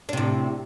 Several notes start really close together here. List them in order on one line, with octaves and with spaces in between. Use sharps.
D4 C3 A2